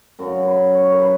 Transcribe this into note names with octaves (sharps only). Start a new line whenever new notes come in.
F#2 C#3 F#3 A#4
B4
C#5
A#4
B4